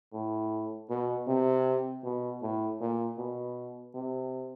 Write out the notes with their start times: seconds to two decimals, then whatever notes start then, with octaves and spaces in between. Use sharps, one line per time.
0.13 A2
0.90 B2
1.27 C3
2.04 B2
2.42 A2
2.80 A#2
3.18 B2
3.94 C3